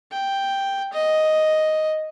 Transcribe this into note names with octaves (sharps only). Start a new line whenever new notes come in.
G5
D#5